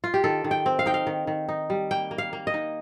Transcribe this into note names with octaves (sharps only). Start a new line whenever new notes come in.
F4
G4
D#3 A4
D#3
G5
C4
F5
D#4 G5
F5
D#3
D#3
D#4
G3
A#3 G5
A#3
F5
A#3
D#5
D#4